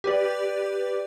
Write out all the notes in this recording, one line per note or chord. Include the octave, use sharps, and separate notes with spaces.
G4 B4 D5